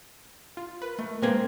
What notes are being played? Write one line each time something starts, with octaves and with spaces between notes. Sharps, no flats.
F4
A#4 B4
A3
G#3 A#3 C4 A#4 B4 G#5